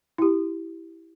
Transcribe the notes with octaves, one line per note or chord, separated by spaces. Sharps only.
E4 G4